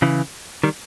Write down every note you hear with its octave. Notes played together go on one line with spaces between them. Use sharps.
C#3 E3
D#3 G3